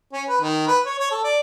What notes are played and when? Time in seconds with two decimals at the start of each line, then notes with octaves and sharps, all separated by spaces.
0.13 C#4
0.28 B4
0.41 D#3
0.67 B4
0.85 C#5
0.99 C#5
1.11 A4
1.24 D5